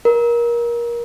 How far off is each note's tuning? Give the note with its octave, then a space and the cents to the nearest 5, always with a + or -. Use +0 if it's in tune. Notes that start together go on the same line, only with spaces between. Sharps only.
A#4 +25